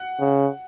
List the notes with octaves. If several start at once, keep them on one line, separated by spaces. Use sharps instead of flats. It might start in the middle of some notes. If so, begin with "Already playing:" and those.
Already playing: F#5
C#3